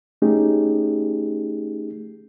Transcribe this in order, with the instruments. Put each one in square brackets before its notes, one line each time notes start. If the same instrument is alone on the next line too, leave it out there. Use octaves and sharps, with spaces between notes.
[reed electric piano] A3 C#4 D#4 G4 G#4